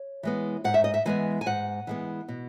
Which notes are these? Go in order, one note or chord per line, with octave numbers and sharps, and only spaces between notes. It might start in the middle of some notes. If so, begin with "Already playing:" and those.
Already playing: C#5
E3 G#3 B3
G#2 F#5
E5
D#5
E5
E3 G#3 B3 G#5
G#5
G#2 F#5
E3 G#3 B3
B2